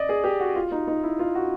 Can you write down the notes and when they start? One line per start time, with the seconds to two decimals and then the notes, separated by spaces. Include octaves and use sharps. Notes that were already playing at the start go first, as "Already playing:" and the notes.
Already playing: D5 D#5
0.09 G#4
0.24 G4
0.40 F#4
0.55 F4
0.71 D#4
0.87 D#4
1.03 E4
1.19 F4
1.35 F#4